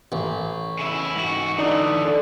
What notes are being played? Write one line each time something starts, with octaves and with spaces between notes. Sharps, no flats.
A1
C#3 E4
G#2 F#4
D3 E3 D#4 D5 D#6
A4 D5